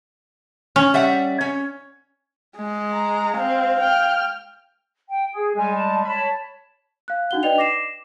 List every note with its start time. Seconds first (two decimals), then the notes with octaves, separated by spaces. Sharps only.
0.76 C#4
0.94 G3 E5 F#5
1.41 C#4 C#5
2.56 G#3
2.93 A#5
3.38 C4 F5
3.80 G5 F6
5.09 G5
5.33 G#4
5.56 G3 G#3 G#5
5.76 A5
6.04 C#5 A5 B5
7.08 F5 F#6
7.31 D4 D#4 F#4 F#5 G7
7.43 B4 D5 D#5 G5 F7
7.58 D6 A#6 C7 E7